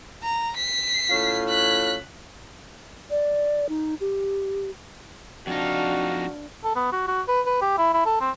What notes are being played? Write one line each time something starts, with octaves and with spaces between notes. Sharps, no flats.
A#5
B6 C7
A2 C#4 F4
F#6 B6
D5
D#4
G4
F2 D4 D#4 F#4 F5
A4
B3
F#4
F#4
B4
B4
G4
E4
E4
A4
C4